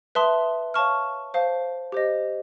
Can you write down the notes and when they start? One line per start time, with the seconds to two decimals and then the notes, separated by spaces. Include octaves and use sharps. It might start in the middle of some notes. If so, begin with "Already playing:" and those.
0.15 B4 E5 A5 C6 D#6
0.74 C#5 F5 A5 C#6 F6
1.34 C5 F5 A5
1.92 G4 C5 D#5